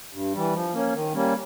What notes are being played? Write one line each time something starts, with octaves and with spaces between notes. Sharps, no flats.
G2
E3 G3
F3
A#3 C#4
D#3
G3 A#3 C#4